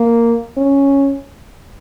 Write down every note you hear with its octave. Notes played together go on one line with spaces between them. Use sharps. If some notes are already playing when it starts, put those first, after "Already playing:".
Already playing: A#3
C#4